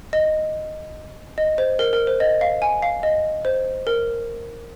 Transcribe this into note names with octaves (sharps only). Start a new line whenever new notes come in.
D#5
D#5
C5
A#4
A#4
C5
D#5
F5
G#5
F5
D#5
C5
A#4